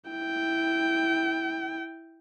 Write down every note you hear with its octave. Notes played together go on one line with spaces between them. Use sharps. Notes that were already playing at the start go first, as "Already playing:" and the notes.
E4 G5